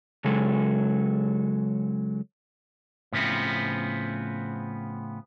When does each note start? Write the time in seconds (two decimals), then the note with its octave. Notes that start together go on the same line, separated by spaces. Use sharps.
0.25 C#3 F#3 G#3 A4
3.12 A2 C#3 F3 B3 C4